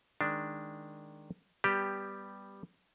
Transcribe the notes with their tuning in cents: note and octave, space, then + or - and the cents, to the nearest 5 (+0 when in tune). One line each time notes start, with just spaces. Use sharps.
D#3 +0 G#3 +0 D4 +0
G3 +5 B3 +0 G4 +0